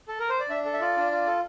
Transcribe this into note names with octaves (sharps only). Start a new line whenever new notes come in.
A4
A#4
C5
D5
D4 E5
A4
E5
F4 D5
D4
F4
A4